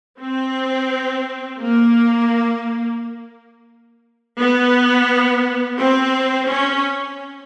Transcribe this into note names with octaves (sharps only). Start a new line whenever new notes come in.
C4
A#3
B3
C4
C#4